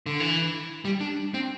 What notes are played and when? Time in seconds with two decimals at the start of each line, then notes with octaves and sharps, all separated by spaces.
0.06 D3
0.20 E3
0.85 G3
1.01 D4
1.34 C4